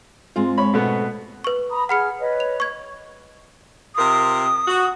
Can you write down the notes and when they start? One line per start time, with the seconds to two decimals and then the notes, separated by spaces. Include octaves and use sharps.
0.36 G#2 G#3 C4 F4
0.58 C#5 B5
0.74 B2 A3 B3
1.44 B4 C#6
1.70 A#5 B5 D#6
1.89 G#4 F#5 B5 F6 C#7
2.19 B4 C#5 D#5
2.40 F7
2.60 C#6 G#6
3.95 C3 F4 A#4 D#6
4.66 F#4